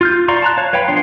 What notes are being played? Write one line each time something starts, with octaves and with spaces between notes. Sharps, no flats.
F4 F6 G6
D5 F5 A#5 C6 C#6
A5 A#5 F#6
C#5 F5 A5
B4 C#5 F5 G5 B5
F3 B3 D4 C6